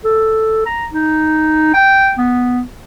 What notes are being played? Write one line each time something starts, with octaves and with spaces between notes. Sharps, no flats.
A4
A#5
D#4
G5
B3